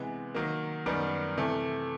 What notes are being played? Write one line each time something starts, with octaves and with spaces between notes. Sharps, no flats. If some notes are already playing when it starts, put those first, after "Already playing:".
Already playing: C3 E3 G#3 B3
D#3 F#3 A#3
F#2 D#3 G3 B3
C3 E3 A3